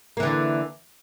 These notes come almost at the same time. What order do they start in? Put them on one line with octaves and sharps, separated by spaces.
A#3 E3 D3